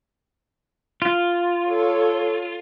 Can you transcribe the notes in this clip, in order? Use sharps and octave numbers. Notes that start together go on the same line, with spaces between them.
F4
A4 C#5